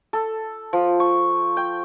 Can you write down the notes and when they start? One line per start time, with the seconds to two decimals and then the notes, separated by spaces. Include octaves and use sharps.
0.13 A4
0.73 F3
1.00 C#6
1.57 G5